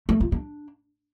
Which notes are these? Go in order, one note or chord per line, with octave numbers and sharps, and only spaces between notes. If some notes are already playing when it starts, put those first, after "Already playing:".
A3
F4
D4